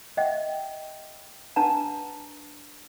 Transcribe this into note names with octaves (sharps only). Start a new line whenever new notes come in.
D#5 E5 F#5 G5
D4 B4 F#5 A5 A#5